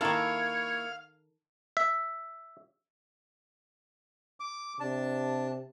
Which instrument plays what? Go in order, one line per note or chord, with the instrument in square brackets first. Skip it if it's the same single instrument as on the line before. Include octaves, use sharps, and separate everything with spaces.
[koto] D#3 A4 [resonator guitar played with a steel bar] A#3 E4 [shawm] C#5 [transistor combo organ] F5
[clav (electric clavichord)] E5
[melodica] D6
[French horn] C3 [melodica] D4 A5